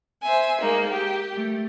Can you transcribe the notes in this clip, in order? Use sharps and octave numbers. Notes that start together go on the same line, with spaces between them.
C5 E5 G#5
G#3 A#3 D#4
G4
A3